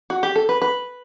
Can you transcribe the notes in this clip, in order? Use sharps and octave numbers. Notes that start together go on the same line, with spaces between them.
F#4
G4
A4
B4
B4